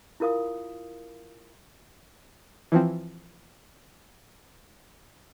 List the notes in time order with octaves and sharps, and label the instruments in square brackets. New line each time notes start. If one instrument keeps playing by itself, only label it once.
[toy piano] E4 F4 A#4 F5 D#6
[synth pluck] E3 F3 C4